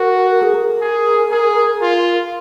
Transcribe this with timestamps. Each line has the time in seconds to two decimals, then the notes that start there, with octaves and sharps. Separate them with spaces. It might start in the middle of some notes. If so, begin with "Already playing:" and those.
Already playing: F#4 A#4
0.31 A#4
0.43 G#4
0.54 A#4
0.81 G#4
1.32 G#4
1.82 F4